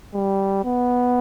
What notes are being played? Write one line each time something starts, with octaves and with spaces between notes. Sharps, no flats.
G3
B3